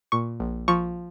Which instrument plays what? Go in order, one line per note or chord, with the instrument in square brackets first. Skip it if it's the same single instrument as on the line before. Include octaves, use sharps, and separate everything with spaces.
[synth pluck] A#2 C#6
A#1
F3 C#6